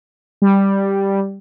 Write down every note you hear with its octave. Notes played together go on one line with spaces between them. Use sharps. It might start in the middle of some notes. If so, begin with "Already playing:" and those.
G3